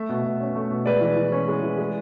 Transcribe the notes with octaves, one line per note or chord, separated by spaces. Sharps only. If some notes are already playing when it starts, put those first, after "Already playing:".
Already playing: A3 E5
B2
B2
C#4
A3
B2
G#3 B4 D5
E3
E3
C#4
G#3
E3
G#3